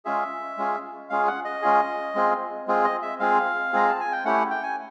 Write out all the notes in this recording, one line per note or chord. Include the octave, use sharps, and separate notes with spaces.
G#3 C#4 F4 G#4 E5
G#3 C#4 F4 G#4
G#3 C#4 F4 G#4 F5
F#5
D#5
G#3 C#4 F4 G#4
G#3 C4 F4 G#4
G#3 C4 F4 G#4
D#5
E5
G#3 C4 F4 G#4 F5
G#3 C4 F4 G#4 A#5
A5
G#5
G5
A3 C#4 E4 G4 F#5
G5
G#5